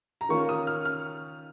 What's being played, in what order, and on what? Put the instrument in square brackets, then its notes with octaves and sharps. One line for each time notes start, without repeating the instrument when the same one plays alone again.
[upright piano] A#5
D#3 A#3 C#4 F4 C#6
D#6
F6
F6